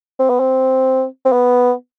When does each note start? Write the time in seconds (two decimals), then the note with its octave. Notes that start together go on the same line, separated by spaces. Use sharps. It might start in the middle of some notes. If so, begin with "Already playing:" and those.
0.20 C4
0.30 B3
0.40 C4
1.25 C4
1.32 B3